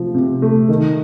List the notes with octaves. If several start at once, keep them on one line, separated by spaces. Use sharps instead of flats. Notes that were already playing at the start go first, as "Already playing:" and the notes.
Already playing: C3 F3 A3
C3
A3
D#3